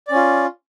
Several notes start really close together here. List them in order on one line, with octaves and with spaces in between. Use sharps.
D5 C#4 F4